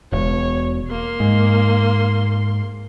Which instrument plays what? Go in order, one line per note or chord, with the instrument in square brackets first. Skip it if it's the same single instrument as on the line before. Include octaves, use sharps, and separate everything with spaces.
[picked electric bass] E1 [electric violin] C#5
[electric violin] A#3 C6
[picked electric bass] G#2